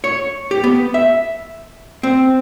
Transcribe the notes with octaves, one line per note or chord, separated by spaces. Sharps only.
C#5
G4
B3
E5
C4